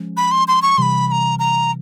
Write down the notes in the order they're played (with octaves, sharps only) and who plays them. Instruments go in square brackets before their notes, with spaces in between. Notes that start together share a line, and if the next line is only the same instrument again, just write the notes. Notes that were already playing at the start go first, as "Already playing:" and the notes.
Already playing: [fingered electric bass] F3 G#3 C#4
[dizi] B5
C6
C6
C#6
[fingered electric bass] C3 E3 G3 [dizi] B5 C6
[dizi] B5
A#5
A#5